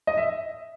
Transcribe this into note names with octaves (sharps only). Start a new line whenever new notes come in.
D#5
E5